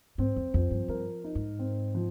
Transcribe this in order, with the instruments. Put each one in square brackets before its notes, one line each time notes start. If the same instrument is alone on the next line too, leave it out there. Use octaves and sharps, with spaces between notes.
[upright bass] G#2 [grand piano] C4
[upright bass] F2
[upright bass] F2 [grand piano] F3
[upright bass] G2
[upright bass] G2 [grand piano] A#4
[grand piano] D#4
[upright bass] G#2
[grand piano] C4
F3